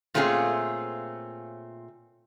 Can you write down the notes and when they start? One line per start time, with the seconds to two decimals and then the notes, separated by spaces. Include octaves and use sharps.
0.14 A#2 A3 C4 C#4 F4 G#4